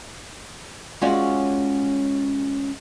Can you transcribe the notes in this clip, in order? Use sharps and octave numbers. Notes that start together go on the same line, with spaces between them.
G#3 C#4 F4 F#4 C#5 D5